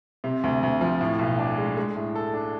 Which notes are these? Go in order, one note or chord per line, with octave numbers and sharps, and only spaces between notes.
C3
D2
D2
F3
A2
B1
D4
G#3
G#3
A2
A4
D4